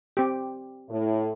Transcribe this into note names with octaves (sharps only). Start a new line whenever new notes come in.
C4 G4
A2